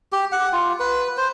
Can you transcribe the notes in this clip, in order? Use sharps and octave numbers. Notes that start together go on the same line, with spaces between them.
G4
F#5
F4
B4
C5